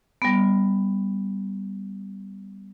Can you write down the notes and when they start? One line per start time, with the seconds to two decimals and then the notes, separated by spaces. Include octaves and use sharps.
0.22 G3 B3